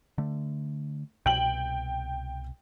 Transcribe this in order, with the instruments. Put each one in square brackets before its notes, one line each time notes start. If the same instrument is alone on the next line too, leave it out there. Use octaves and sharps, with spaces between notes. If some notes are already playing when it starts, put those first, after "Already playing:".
[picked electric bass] D3 A3
[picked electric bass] C2 B2 [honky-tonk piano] G5 F#7